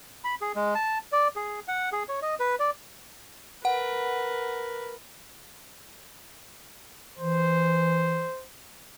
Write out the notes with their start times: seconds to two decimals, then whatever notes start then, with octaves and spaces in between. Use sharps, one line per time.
0.24 B5
0.41 G#4
0.56 G#3
0.75 A5
1.12 D5
1.36 G#4
1.68 F#5
1.92 G#4
2.09 C#5
2.22 D#5
2.40 B4
2.60 D5
3.65 A#4 B4 F#5
7.18 E3 C5